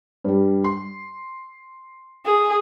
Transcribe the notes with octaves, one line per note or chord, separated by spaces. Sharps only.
G2 G3
C6
G#4